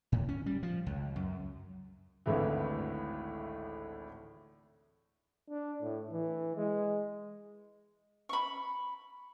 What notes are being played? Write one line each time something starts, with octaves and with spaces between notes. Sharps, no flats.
A2
C#4
G3
F3
C#2
F#2
G#1 D2 A2 E3
D4
A2
E3
G#3
B5 C#6